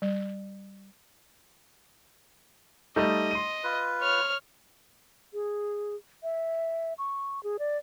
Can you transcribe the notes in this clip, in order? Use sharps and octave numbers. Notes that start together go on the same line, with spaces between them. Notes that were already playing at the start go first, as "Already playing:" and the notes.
G3
G3 A3 D#4 D#5
C6 D#7
F4 B4
C#5 F6
G#4
E5
C#6
G#4
D5